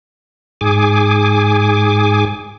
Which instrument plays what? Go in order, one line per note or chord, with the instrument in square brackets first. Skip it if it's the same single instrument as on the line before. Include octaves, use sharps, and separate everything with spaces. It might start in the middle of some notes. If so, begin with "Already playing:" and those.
[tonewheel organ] G#2 G#4 G#5 D6